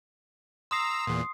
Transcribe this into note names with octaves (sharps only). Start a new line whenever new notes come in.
A#5 C6 D#6 E6 C7
E2 A#2